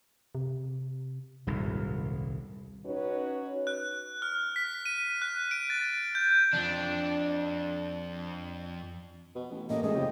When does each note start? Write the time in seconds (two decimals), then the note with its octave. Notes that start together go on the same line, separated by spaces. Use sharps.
0.35 C3
1.47 D#1 C2 G#2
2.86 C#4 D#4 F#4 B4 C#5
3.67 F#6
4.22 F6
4.56 B6
4.86 D#7
5.22 F#6
5.51 D7
5.70 A6
6.15 G6
6.53 F2 F3 D4
9.35 B2
9.51 A1
9.70 A1 A2 A#3 D#5
9.83 E1 G#3 A3 D#5
9.95 F2 C#3 G4